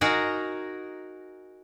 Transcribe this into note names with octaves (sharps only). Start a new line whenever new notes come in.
D#4 F#4 G#4 A#4